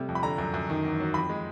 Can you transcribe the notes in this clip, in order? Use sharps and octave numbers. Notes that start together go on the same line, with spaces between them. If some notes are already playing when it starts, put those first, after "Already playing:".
Already playing: C3 G3 A3
F2
B5
D3 A#5
F#2
F#2
D#3
E2
F#3
F2 B5
G#3